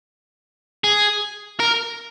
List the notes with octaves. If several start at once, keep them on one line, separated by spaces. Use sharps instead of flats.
G#4
A#4